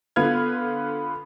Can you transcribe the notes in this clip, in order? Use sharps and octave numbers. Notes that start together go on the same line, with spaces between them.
D3 B3 F4 B4 F6 G#6